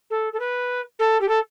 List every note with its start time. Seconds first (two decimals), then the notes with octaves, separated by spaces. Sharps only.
0.10 A4
0.33 A4
0.39 B4
0.99 A4
1.21 G4
1.28 A4